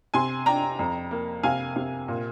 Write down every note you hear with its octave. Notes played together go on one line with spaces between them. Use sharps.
C3 G#5 C6
D4 G5 A#5
F2
A#3
C3 F5 G#5
C3
A#2